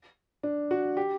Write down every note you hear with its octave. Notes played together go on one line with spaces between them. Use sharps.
D4
F#4
G4